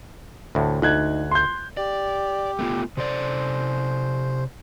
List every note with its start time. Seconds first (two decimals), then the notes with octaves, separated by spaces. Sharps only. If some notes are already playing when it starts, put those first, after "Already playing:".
0.55 D2 A2
0.82 D2 D#4 F#6 G#6
1.31 C6 G6
1.77 G4 D5
2.59 A3 B3 F4
2.97 C3 A4 C5 D5